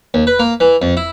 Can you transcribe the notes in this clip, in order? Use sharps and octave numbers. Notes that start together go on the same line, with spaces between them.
D#2
B4
A#3
E3
F2
E4